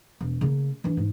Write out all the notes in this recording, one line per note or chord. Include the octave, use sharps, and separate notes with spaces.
E1
C#3 A#3
E3 D4
G#2